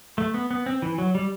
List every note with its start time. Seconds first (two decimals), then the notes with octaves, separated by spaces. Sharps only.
0.18 A3
0.34 B3
0.51 B3
0.66 C4
0.82 E3
0.98 F#3
1.15 G3